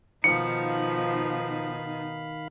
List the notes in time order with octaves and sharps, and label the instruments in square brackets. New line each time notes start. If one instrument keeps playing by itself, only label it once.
[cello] B2 D#4 [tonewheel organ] D#3 F5 B5 [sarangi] F3 [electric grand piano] C#7